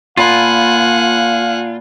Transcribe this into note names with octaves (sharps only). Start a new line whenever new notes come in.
A#2 F4 F5 F#5 G#5 A5 B5